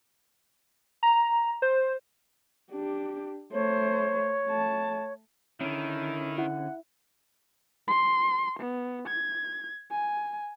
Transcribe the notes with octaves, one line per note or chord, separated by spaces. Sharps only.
A#5
C5
D4 G4
A3 C5 C#5
A3 A5
D3 D#3 C#4 E4
E4 F#5
C6
B3
G#6
G#5